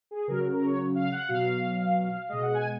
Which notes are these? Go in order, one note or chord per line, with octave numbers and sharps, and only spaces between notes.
G#4
C#3 F#3 A#4
A#4
C#5
F5
F#5
B2 F#3 F5
B2 G#3 D#5
F#5
G#5